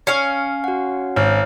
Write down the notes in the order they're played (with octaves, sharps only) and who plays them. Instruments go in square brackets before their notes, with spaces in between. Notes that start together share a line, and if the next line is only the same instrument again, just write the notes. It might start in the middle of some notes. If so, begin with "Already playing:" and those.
[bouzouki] C#4 F5 [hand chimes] C7
[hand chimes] F#4 F#5
[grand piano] G#1 [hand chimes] C#5 F6